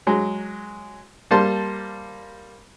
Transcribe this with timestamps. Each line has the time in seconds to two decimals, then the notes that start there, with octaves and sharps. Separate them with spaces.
0.07 F#3 G#3
1.31 G3 A#3 C5 A5 C6